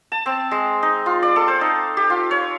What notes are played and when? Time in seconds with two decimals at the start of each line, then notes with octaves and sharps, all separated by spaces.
0.12 A5
0.26 C4
0.51 G#3
0.83 D#4
1.06 F4
1.23 D5
1.36 A4
1.48 C5
1.61 D#4
1.97 G4
2.10 F4
2.31 C#5